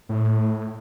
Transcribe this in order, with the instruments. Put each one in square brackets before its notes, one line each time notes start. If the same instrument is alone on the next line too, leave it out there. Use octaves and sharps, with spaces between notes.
[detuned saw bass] A2